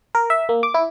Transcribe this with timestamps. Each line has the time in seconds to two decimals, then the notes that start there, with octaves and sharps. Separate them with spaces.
0.15 A#4
0.30 E5
0.49 A#3
0.63 D6
0.74 E4